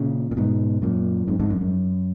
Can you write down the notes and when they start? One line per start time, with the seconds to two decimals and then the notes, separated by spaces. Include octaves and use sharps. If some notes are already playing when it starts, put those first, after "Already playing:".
Already playing: A#2 C#3
0.31 A#2
0.37 G#2 B2
0.82 F#2 A#2
1.28 F2 G#2
1.40 F2 G#2
1.50 F#2
1.61 F#2